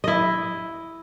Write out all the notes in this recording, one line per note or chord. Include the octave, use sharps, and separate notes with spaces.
E4 D#5